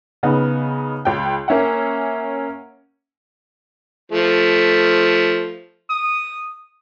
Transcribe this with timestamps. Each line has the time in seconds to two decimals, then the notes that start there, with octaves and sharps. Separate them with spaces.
0.23 C#3 B3 D#4
1.05 C#2 G5
1.48 A#3 C#4 E5 F#5
4.12 F3 A3
5.90 D#6